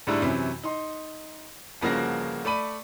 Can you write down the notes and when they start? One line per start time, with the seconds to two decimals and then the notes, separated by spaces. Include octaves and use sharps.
0.07 G#2 D3 G3 A3 D4 E4
0.21 F#2 C3 E3 C#4
0.64 D#4 C6
1.81 G1 C#3 F3 A#3 F#4 A#6
2.45 A3 D5 B5 D#7